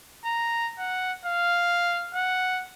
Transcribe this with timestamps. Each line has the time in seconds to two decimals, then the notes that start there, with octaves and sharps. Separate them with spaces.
0.25 A#5
0.79 F#5
1.25 F5
2.15 F#5